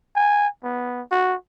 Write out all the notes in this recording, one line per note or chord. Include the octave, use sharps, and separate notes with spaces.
G#5
B3
F#4